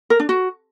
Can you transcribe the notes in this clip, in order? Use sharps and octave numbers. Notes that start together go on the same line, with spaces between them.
A#4
D4
F#4